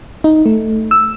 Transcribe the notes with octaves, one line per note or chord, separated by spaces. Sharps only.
D#4
A3
E6